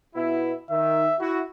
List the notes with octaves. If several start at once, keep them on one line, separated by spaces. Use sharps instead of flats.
B2 B3 E4
D#3 E5
E4 F#4